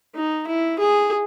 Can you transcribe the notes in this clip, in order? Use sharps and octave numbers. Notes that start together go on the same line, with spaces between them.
D#4
E4
G#4